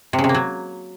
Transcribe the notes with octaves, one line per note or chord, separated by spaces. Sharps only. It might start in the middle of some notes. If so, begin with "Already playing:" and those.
C3
C#3
C3
A#3
F#3